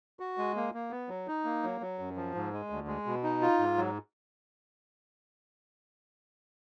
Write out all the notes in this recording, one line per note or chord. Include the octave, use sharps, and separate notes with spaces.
F#4
G#3
A#3
A#3
B3
F#3
D#4
A#3
F#3
F#3
F#2
F3
G#2
G#3
D2
G#3
B2
D#4
F4
G#2
F#3